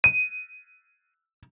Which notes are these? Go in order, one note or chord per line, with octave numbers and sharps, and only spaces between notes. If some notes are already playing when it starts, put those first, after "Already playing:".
D#7